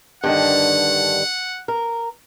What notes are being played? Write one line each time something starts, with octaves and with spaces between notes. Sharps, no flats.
G2 D3 D#3 F#5
A#4